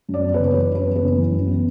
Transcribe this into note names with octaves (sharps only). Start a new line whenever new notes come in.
F#2
D5
B3
B4
F#1
C#5
E3 B4
F#2 B4
B3
B4
F#1
E3
F#2
B3